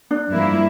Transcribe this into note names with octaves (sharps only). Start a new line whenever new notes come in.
D4
G2 F3 A#3 E4